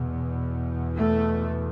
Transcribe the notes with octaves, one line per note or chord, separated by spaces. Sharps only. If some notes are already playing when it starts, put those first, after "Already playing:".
Already playing: E2 B2
A3